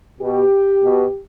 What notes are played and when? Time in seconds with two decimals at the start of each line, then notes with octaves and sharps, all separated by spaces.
0.20 B2 G4
0.83 B2